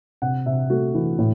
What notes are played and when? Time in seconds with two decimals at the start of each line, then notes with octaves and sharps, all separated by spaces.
0.22 C3 F#5
0.46 C3 E5
0.70 A3 F#4
0.94 E3
1.19 A2